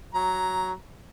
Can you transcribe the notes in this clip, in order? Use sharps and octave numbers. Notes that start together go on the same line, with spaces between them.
F#3 A#5